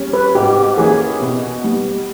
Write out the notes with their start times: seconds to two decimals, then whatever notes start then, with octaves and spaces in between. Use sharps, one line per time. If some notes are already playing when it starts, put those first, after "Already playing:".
Already playing: G3 C#4
0.13 B4
0.35 G#2 G4
0.78 E3 A#3 C#4 G4 G#4
1.20 B2
1.64 G3 B3